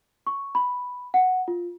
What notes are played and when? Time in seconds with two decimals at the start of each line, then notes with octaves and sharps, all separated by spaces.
0.27 C#6
0.55 B5
1.14 F#5
1.48 F4